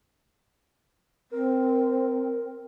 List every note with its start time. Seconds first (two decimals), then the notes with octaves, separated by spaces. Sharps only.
1.31 C4 A#4